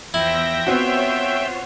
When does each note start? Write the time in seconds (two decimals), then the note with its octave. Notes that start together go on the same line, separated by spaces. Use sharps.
0.14 E2 F3 E4 E5 G5 A#6
0.67 B3 C4 F4 F#4 C5 C#5